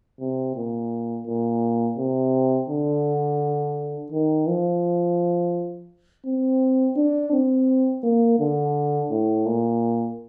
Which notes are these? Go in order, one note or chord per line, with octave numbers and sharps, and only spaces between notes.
C3
A#2
A#2
C3
D3
D#3
F3
C4
D4
C4
A#3
D3
A2
A#2